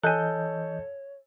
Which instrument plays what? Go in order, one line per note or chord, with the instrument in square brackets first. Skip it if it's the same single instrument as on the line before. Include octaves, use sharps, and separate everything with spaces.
[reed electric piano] E3 D#5 G6 [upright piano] A4 [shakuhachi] C#5 [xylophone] G#5 F#6